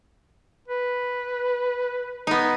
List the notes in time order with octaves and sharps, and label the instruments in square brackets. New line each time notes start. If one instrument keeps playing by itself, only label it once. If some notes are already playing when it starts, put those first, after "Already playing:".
[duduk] B4
[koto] B3 D#4